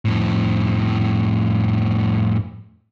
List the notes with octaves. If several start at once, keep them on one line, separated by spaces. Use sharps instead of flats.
F2 A2